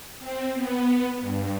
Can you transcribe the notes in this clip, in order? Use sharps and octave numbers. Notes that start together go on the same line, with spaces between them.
C4
B3
G2